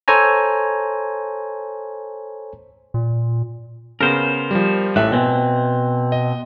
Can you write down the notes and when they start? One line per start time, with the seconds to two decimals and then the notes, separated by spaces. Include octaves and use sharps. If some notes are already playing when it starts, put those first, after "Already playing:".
0.08 A4 C5 C#5 G#5 A#5
2.94 A#2
4.01 C#3 B3 A#4 C5
4.51 F3 G3
4.96 A1 A2 E5 F#6
5.12 B2 C4 G#5
6.12 D#5